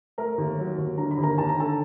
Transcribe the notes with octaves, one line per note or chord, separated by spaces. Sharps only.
A3 A#4 A#5
D#2
F#3
D#2
D3 A#5
B5
D#2
A#4 A#5
D#2 A5
A#5
D3 A4 A5